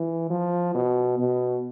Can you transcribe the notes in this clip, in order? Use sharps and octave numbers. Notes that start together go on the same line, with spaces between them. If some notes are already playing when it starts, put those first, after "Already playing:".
Already playing: E3
F3
B2
B2